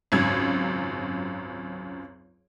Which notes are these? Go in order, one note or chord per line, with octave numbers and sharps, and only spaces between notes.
G#1 C#2 F#2 G#6